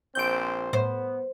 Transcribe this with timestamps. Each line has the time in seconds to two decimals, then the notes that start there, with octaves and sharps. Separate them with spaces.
0.15 A#1 C4 C5 G6 D7
0.73 A2 B3 C5